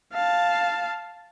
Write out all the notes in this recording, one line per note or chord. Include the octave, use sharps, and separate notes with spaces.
F5 A5